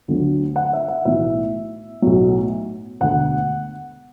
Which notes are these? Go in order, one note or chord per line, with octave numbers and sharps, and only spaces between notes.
D2 D3 F#3
F#5
E5
F#5
B1 A2 E3 E5
B1 A2 F#3
E1 D2 D3 F#5